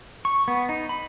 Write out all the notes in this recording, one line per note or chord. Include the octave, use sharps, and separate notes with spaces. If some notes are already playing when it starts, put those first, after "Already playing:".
C#6
B3
D#4
B5